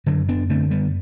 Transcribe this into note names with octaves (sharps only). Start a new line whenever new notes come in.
F#2 D3 F#3
B3 D4
D3 A3 C4
G3 B3